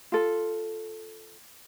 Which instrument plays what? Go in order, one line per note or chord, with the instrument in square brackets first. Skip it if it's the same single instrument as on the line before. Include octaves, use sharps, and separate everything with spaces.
[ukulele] F4 A4